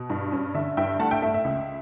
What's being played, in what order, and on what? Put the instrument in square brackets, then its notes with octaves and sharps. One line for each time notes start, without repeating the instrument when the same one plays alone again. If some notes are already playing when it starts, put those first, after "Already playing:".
Already playing: [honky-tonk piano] B2
G2
C#4
D3 E5
G2 E5 G5
A3 F#5 A5
E5 G5
A3 E5
E5
C#2